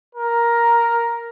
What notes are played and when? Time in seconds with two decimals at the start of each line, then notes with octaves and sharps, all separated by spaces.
0.15 A#4